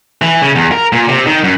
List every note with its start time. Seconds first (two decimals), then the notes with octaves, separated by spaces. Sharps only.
0.22 E3
0.42 C#3
0.55 E2
0.72 A#4
0.92 A#2
1.08 C3
1.27 D#3
1.44 F#2